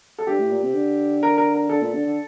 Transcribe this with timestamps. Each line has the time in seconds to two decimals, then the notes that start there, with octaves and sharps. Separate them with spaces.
0.18 A4
0.27 G2 G4
0.39 A2
0.50 A#2
0.62 C3
0.74 D3
1.23 A#4
1.38 A#4
1.54 A#4
1.69 D3 A4
1.81 A#2
1.94 D3
2.05 D3